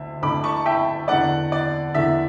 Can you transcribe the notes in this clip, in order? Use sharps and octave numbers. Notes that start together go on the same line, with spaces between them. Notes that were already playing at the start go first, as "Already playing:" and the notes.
Already playing: D2 D3 E5
D2 D3 B5 D6
A5 C#6
E5 G5
E2 D3 D5 F#5
D5
E2 D3 E5